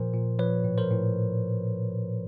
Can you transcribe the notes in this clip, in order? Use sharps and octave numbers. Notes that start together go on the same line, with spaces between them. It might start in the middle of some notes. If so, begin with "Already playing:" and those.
Already playing: A#2 F3 A#4 C5
A#2
F3 B4 C#5
A2
A#4 C5
A2